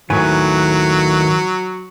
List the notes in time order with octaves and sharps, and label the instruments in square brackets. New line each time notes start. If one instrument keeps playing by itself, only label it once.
[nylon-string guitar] D#2 A2 G#5 [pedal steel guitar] D#3 B4 C#5 [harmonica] F#3